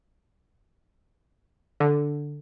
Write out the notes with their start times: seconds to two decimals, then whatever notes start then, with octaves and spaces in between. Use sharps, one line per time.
1.80 D3